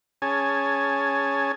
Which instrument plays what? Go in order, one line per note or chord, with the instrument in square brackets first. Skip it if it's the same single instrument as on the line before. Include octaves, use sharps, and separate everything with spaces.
[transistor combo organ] C#4 G#4 C#5 G#5 A5